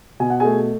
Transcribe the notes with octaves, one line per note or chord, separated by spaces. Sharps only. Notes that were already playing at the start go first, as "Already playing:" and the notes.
B2 G#5
F#5
A3 G#4 G#5